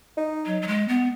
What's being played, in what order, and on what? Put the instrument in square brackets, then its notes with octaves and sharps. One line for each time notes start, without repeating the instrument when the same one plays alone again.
[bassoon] D#4
[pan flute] F#3
F#3
G#3
B3